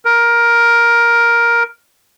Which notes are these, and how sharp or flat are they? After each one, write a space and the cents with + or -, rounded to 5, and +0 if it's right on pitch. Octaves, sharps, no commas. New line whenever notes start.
A#4 +10